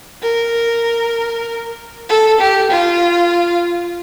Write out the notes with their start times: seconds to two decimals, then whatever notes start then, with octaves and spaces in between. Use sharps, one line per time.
0.22 A#4
2.09 A4
2.40 G4
2.71 F4